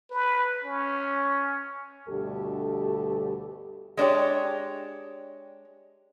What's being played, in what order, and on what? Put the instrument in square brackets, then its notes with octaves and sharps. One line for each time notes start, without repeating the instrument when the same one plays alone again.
[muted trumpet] B4
C#4
[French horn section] D2 G2 B2 G4 A4
[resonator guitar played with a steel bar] G#3 D4 G4 C#5